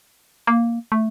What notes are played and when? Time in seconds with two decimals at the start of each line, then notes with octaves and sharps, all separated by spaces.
0.47 A#3
0.92 A3